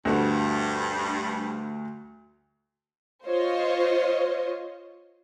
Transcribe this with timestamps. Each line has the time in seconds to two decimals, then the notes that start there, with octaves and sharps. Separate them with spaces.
0.05 D2 G2 F#4
3.26 F4 C5 C#5 D#5